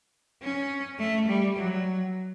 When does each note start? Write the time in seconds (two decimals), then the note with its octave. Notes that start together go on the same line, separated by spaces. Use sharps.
0.42 C#4
0.99 A3
1.28 G3
1.56 F#3